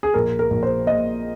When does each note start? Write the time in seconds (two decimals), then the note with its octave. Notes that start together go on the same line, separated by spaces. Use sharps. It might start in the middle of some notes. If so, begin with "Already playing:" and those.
0.03 G#4
0.14 A#1 A#4
0.39 A#4
0.51 A#1
0.63 C5
0.87 A#2 D#5